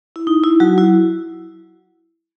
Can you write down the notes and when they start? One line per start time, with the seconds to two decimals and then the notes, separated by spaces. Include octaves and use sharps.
0.16 E4
0.27 D#4
0.44 E4
0.60 F#3 F#4
0.78 E4